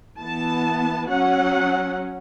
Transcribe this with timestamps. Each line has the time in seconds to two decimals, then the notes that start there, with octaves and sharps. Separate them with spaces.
0.20 E3 B3 A5
1.10 F#3 C#4 F#5